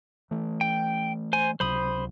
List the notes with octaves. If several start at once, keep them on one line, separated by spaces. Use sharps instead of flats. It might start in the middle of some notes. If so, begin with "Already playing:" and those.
E3 A3
G5
C5 G#5
C#2 C3 F#3 C5 B5 D#6